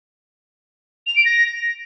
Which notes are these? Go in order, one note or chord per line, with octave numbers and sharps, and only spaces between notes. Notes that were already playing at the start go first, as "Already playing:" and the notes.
F7
D7
A#6